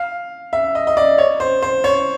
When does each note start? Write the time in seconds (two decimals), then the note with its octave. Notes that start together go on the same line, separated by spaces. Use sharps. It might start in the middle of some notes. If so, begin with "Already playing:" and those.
Already playing: F5
0.53 E5
0.75 D#5
0.87 D#5
0.97 D5
1.18 C#5
1.40 C5
1.62 C5
1.84 C#5